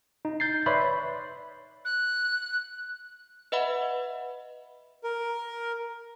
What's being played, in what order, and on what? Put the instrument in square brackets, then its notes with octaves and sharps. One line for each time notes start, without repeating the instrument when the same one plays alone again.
[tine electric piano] D#4
G6 A6 C7
B4 C#5 D5 E5 B5 C6
[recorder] F#6
[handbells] B4 D#5 E5 F#5 B5
[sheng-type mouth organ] A#4